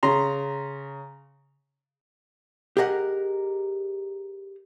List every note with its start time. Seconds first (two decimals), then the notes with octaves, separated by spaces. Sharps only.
0.03 C#3 A#5 C6
2.77 G4 G#4 A#4 D#5 F#5